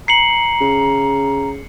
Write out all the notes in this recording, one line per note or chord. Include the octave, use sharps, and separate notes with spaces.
A#5 C7 C#7 F#7
C#3